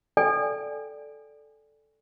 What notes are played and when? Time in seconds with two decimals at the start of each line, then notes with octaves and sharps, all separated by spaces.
0.17 A4 D5 G5 G#5